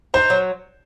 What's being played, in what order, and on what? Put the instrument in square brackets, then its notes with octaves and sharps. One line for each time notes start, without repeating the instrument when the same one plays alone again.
[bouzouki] D#4 [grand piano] C5
[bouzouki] F#3